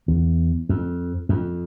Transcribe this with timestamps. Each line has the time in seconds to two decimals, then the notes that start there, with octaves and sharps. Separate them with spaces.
0.08 E2
0.69 F2
1.29 F2